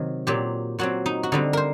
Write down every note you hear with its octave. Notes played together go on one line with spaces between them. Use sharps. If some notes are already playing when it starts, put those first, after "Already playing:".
Already playing: C3 D#3 F#3
A#2 F#3 C4 G4
A#2 F#3 C4 F#4
D#4
F#4
D3 G3 C4 D#4
A#4 C5